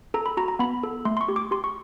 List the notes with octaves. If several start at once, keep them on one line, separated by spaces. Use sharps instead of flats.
A4 A#5
B5
F#4 A#5
A#5
B3 B5
A4
A3 C6
C6
C#6
G4
D6
G4 C6
C#6